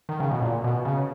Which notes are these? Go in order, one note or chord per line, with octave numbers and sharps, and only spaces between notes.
D#3
C#3
B2
A#2
B2
C#3